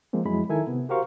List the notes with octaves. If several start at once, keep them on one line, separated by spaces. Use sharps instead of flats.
F3 G#3 A#3 C4
F2 F#3 G#3 E4 B5
D#3 E4 A4 A#4 E5 G#5
C3 B3
F#4 G4 A#4 C5 F5 C#6